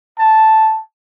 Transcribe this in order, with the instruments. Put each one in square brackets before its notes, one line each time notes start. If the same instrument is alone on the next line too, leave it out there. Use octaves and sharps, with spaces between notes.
[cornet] A5